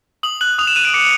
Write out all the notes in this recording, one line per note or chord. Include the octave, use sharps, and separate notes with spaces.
D#6 F#7
F#6 F#7
D#6 F7
E7
F#6 D#7
D7
D6 C#7